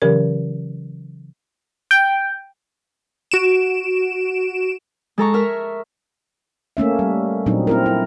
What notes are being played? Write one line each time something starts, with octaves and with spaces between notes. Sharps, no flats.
C#3 E3 F#3 C#4 G4 A#4
G5
F#4 D7 E7
G#3 A4 A#5 C#6
A#4 E5 F6
A3 A#3 C#4 E5
G3
A#2 F#3 C4 D4 D#4
C4 E4 A#4
E4